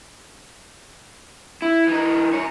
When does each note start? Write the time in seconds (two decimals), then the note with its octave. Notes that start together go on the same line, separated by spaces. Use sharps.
1.62 E4
1.87 E3 D#4
2.34 F#2 C#5